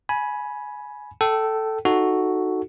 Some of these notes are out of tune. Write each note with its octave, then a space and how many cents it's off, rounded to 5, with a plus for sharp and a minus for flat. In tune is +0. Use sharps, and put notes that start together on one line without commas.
G#5 +15 B5 -15
A4 +0 G5 -25
D#4 +0 F#4 +0 A4 +0